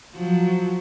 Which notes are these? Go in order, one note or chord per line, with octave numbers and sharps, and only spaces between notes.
F3 F#3